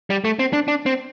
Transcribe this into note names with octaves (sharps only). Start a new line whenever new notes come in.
G3
A3
C4
D4
D4
C4